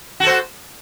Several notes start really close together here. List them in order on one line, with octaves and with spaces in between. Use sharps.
F#4 A4 C5